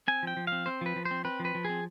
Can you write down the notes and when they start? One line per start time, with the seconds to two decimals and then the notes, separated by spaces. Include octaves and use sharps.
0.08 C4 G#5
0.23 F3 G5
0.37 F3
0.47 C4 F5
0.66 C4 C5
0.81 F3 B4
0.96 F3
1.05 C5
1.11 C4
1.25 C4 B4
1.40 F3
1.45 B4
1.55 F3
1.65 C4 G#4